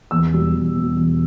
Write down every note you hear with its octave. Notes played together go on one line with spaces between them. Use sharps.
E2 E6
B2 G3
E2
B2 G3
E2